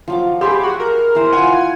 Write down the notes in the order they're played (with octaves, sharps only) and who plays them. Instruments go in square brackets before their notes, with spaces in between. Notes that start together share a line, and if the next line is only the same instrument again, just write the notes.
[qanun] F3 F#3 D6
[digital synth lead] G4 [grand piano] G#4 B5 C6 [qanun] E5
[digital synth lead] F#4
A#4
[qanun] E3 C5
[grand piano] F4 F#5 [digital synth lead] G#5